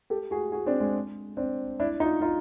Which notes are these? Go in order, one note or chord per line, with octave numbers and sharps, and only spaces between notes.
G4 A4
F#4 G#4
F#4 G#4
C4 D4
G#3
C4 D4
D4 E4
D#4 F4
D#4 F4